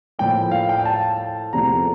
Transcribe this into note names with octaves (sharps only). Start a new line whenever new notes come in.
A2 F3 A#3 G5
F5
G5
G5
A5
E2 C3 F3 A3 A#5